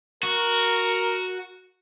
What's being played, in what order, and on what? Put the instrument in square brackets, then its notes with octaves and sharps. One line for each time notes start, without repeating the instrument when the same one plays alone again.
[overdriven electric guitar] F#4 [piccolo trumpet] A#4